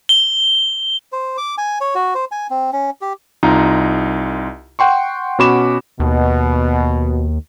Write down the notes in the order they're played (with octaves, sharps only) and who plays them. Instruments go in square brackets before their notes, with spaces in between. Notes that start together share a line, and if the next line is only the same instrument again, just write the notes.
[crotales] G7
[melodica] C5
D6
G#5
C#5
F#4
C5
G#5
C4
C#4
G4
[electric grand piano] C2 D#4 F4 D#5 A#5
F#5 G5 C6 C#6
B2 C#4 F#4 B5 D6 E7
[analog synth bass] D#2 [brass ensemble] B2